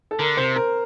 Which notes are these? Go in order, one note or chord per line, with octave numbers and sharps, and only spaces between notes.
A4
D3 A#4
C3 C5
A#4